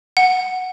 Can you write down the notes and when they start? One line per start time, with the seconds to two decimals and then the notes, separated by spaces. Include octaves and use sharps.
0.17 F#5